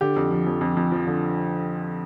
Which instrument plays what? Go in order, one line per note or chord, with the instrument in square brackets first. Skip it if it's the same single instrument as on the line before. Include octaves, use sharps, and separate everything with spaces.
[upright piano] D3 G4
F2
F3
F2
F2
F2
F3
D3